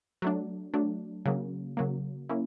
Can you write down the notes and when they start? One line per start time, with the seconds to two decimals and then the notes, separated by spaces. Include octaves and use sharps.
0.22 F#3 A3 D4
0.74 F#3 A3 D4
1.26 C#3 F#3 A#3
1.77 C#3 F#3 A#3
2.29 A#3 C#4 E4